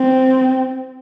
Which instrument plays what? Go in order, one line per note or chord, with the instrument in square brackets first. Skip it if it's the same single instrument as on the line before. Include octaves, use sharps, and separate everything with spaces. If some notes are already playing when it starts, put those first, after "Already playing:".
Already playing: [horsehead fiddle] C4